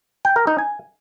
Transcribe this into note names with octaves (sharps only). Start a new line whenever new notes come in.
G5
A#4
D#4
G#5